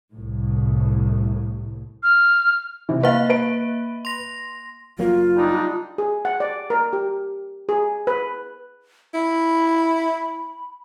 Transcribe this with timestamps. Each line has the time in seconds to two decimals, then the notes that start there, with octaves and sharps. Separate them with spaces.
0.13 C2 A2
2.03 F6
2.89 C3 E3
3.03 A#3 B4 E5 F5
3.30 B4 D7
4.05 C6 A#6
4.99 F#1 F#3 A#3 F4
5.37 G3 D4 D#4
5.98 G#4
6.25 F#5
6.40 D5
6.70 A#4
6.93 G4
7.69 G#4
8.07 B4
9.14 E4 B5